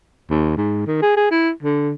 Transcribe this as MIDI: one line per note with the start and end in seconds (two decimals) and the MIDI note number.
0.30 0.53 39
0.57 0.84 44
0.87 0.99 51
1.02 1.17 68
1.17 1.30 68
1.31 1.51 64
1.63 1.93 50